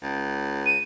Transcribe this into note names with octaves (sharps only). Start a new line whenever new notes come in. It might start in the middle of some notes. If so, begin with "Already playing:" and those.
C#2
D#7